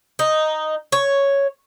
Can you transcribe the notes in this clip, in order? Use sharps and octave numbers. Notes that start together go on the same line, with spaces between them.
D#4
C#5